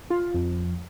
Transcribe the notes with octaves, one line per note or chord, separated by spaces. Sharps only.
F4
F2